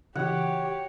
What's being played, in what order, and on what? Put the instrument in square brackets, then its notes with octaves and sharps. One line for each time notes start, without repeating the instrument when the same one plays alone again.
[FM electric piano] C#3 E3 [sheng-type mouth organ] F#4 C#5 [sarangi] G4 [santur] F#5